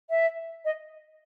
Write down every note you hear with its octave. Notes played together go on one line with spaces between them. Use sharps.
E5
D#5